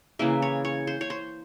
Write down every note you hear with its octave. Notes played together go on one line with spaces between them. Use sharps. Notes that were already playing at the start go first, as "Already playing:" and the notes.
C#3 E3 A#3 E5
C#5
C#5
C5
C#5
C5